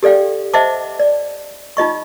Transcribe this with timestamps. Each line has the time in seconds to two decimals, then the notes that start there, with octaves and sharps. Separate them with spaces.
0.03 G4 A4 D5 F5 G5
0.54 C5 D#5 E5 F#5 A5 D6
0.99 D5
1.77 D#4 F4 D#5 C#6